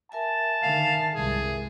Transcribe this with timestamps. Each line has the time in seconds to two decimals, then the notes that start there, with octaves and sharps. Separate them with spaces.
0.12 A#4 E5 G#5 A5
0.63 D3 D#3 F5
1.14 C2 G2 G#3 G#4